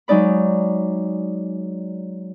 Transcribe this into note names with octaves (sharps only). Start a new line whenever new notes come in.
F#3 G#3 D#4 D5 B5